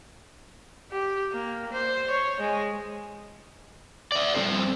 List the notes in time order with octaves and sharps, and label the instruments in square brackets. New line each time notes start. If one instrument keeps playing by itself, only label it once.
[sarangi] G4
A#3
C5
C#5
G#3
[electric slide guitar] D5 E5
G3 C4 A4 C5